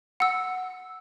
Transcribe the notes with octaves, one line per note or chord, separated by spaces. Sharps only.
F#5 E6